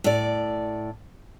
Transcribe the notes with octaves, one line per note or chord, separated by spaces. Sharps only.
A2 D5